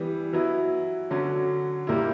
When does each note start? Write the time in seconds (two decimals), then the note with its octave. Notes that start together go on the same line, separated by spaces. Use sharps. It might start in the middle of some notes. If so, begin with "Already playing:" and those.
Already playing: E3 G3 B3
0.33 F#3 B3 E4
1.10 D3 F#3 C#4
1.87 A#2 G3 A#3 E4